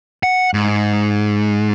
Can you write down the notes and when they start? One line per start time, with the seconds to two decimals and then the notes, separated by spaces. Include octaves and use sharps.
0.23 F#5
0.54 G#2